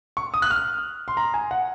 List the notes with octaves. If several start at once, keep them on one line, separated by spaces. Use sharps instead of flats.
C#6
D#6
F#6
F6
C6
A#5
G#5
F#5